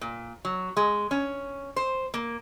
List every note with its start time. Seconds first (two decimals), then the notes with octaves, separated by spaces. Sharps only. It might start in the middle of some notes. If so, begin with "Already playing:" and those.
0.01 A#2
0.45 F#3
0.77 G#3
1.11 C#4
1.76 C5
2.14 A#3